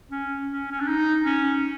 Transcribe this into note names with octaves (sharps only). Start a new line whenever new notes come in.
C#4
C#4
C#4
D4
D#4
C#4